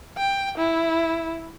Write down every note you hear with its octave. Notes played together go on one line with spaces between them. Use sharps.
G5
E4